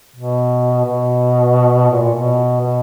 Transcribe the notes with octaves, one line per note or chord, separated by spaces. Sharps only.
B2
B2
A#2
A#2
B2
B2